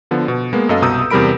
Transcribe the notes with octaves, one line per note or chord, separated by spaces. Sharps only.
D3 F3 B3
B2
G#3 A#3 B3
F#2 A4 D#5 F5
C2 B2 A#5 D#6 E6 G6
E2 C3 G3 A#4 B5 D7